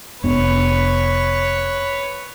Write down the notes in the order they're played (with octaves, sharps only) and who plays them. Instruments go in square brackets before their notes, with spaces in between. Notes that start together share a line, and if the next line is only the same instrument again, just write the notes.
[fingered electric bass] F1 B3 D4 [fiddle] B4 C#5